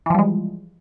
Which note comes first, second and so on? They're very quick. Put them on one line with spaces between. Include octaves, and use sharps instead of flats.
E3 F3 G3 G#3